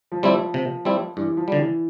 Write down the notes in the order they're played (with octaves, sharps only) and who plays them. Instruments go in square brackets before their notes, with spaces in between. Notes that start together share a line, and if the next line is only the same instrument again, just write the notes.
[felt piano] F3
[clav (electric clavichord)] G3 C4 E4
[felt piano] F3
[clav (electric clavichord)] C3
G3 C4 E4
[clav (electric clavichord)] G2 [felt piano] E3
[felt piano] F3
[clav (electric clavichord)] D3 G3
[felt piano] E3